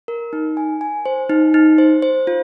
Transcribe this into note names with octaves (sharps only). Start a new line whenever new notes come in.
A#4
D#4
G#5
G#5
C5
D#4
D#4
C5
C5
F4